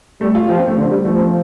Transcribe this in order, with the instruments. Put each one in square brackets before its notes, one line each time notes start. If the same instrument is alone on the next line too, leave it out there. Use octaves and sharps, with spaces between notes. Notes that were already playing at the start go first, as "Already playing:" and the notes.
[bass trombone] G3 [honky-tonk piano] A3
[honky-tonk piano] F4
[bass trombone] F3 [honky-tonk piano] G4
[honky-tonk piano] C4
A3
[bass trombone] D3 [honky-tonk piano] C4
[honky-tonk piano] G3
[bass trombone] F3 [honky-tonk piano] A3
[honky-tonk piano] C4